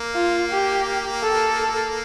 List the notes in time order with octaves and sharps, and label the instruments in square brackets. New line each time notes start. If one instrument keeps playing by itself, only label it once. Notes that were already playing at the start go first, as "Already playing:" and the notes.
Already playing: [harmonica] A#3
[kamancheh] F4
G4
A4